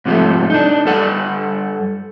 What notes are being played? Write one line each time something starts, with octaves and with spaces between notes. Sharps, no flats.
G#2 C3 F3 G3 A3
D4 D#4
G2 G3 A4 F#5